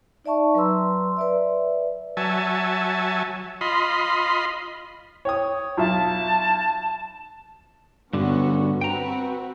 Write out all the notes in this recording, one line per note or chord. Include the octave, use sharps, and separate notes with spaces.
D#4 D5 E5 A5 C#6
F#3 B4 A#5 C6 E6
B4 D5 E5
F#3 E5 G#5 A5
F4 D#5 B5 C6
C#5 G5 D#6
B1 F4 E5 A5
G2 D3 B3 C#4 F#4
C4 F#4 B4 G5 A#5